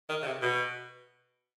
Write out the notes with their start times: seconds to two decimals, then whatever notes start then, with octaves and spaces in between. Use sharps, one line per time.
0.09 D#3
0.22 C#3
0.26 C3
0.42 B2